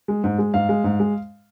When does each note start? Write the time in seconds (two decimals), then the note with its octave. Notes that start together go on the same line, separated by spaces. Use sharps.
0.08 G#3
0.24 G#2
0.38 G#3
0.54 G#2 F5
0.69 G#3
0.84 G#2
0.99 G#3